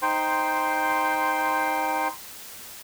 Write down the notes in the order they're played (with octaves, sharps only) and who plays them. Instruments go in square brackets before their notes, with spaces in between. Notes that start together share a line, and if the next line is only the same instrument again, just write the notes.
[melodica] D#4 C5 G5 C6